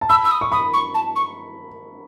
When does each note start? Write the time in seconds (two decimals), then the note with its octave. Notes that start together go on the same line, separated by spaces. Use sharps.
0.01 A5
0.09 B5 E6
0.24 E6
0.31 D#6
0.41 C#6
0.52 B5 D#6
0.73 C#6
0.94 A5
1.15 C#6